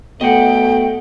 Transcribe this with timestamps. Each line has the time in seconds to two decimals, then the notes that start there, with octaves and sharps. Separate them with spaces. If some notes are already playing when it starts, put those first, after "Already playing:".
0.21 B2 A3 A4 D#5 F#5 G5